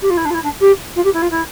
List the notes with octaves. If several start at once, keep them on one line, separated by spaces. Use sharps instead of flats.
G4
F4
E4
D4
F4
E4
D4
G4
F4
G4
E4
F4
E4